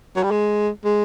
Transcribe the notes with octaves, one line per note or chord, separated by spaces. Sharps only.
F#3
G3
G#3
G#3